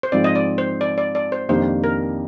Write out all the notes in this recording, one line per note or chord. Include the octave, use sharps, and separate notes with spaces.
C5
G#2 F3 C4 D5
D#5
D5
C5
D5
D5
D5
C5
F2 D#3 A#3 D4 G4 C5
A#4